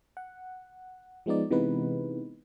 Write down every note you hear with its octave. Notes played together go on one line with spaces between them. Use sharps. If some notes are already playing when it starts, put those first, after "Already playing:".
F#5
F3 G#3 B3 D#4 D5
C3 E3 G#3 B3 D#4 B4